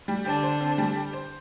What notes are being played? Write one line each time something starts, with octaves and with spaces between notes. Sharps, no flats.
G3
D3 D4 G4
C5
C4
G3
G4
C5